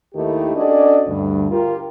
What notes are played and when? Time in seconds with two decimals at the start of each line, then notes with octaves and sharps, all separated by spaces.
0.14 D#2 D#3 A3 E4 G4
0.55 C#4 D4 F#4 A4 D5 D#5
1.07 D2 G2
1.50 F4 G4 A#4